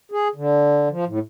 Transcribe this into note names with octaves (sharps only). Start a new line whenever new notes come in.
G#4
D3
F3
A2